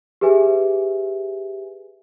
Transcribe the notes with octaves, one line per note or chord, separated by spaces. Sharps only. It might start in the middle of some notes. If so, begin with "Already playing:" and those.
G4 G#4 B4 E5 G#5